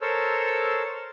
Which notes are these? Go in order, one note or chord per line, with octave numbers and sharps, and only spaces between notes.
A4 A#4 C5 C#5 E6